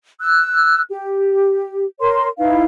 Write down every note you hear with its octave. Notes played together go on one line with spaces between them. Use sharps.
E6 F#6
G4
A#4 C#5 C6
D#4 E4 B4 F5